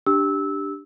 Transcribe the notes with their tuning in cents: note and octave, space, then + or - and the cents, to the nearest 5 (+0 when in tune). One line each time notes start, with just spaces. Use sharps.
D4 +0 G4 +0 E6 -15